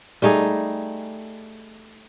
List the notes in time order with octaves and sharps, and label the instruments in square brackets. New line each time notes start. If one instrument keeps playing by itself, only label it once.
[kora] G3 A3 D#4 G#4